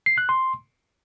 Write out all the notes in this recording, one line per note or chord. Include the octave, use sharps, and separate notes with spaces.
C7
F#6
C6